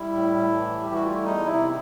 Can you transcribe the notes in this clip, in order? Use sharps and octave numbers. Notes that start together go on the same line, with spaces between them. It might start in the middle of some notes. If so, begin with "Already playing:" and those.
Already playing: G3 E4
A2
A2
E3
G3 G4
F#4
A3 F4
E4
E2 D#4
C3 E4